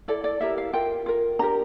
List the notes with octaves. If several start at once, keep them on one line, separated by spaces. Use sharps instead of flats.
E4 A4 D5
D5
E4 G4 A#4 E5
F5
F4 A#4 G5
F4 A#4
D4 G4 A#4 A#5